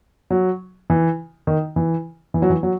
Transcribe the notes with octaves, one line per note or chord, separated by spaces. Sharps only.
F#3
E3
D#3
E3
E3
F#3
E3
F#3